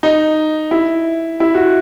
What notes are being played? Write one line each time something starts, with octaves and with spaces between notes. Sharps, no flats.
D#4
E4
E4
F#4